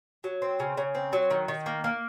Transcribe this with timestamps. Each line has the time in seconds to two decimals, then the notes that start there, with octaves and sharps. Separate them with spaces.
0.24 F#3
0.42 C4
0.60 C#3
0.77 C#3
0.95 C4
1.13 F#3
1.31 D#3
1.48 D#3
1.66 A#3
1.84 A#3